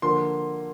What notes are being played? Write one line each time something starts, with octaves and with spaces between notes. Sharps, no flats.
D3 F3 A#3 C6